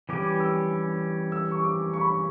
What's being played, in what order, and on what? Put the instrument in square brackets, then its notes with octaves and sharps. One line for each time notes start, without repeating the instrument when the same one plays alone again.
[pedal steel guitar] E3 G3 C#4 G4 [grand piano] D6
[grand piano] E6
E6
C#6
D6
C#6
B5
C#6